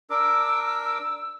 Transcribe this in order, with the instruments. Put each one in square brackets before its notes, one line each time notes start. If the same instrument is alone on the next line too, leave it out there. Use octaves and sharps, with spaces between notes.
[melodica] D4 A#4 D6 [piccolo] E6